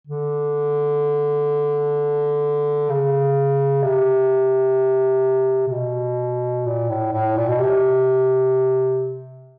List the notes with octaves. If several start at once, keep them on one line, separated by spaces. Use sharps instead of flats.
D3
C#3
C3
C3
B2
A#2
A2
A2
A#2
B2
C3